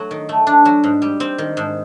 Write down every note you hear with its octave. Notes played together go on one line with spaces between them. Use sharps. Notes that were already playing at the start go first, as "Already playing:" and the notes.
Already playing: F#3 A3
D#3
A3
D4
F#3
G#2
G3
C4
D#3
G#2